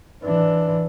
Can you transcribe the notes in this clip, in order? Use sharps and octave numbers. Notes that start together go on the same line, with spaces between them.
E3 D4